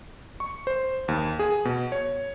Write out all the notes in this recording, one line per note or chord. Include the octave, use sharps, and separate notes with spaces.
C#6
C5
D#2
G#4
B2
C#5